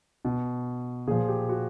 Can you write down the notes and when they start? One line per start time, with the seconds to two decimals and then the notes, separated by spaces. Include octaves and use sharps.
0.25 B2
1.07 A#2 F3 G#4
1.28 G4
1.49 F#4